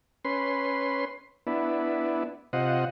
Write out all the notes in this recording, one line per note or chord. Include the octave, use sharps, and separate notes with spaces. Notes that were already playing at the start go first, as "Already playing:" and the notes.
C#4 B4 C6
B3 D4 E4
C3 F4 C5 D#5 F#5